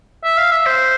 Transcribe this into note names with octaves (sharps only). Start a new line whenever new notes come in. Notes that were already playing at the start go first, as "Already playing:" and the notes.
E5
F5
E5
C5